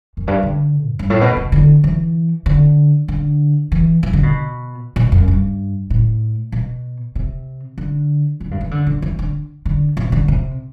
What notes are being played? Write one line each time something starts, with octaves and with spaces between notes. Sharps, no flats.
F#2
G2
D3
F#2
G2
A2
B2
C3
D3
E3
D3
D3
E3
E3
D3
B2
B2
F#2
G2
A2
B2
C3
D3
D3
G2
E3
D3
D3
E3
D3
D3
C3
D3
C3